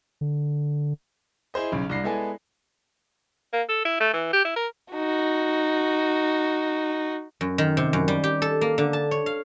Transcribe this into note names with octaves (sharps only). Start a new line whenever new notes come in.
D3
E4 G#4 C5 D#5
B1 C#3
C2 D4 A#6 C7
G#3 B3 E4 A4 D5 G#5
A#3
A4
E4
A3
E3
G4
E4
A#4
D#4 F#4
F#2
D#3
C3
F#2
G3
G4
A4
A#3
D3
A5
C#5
F5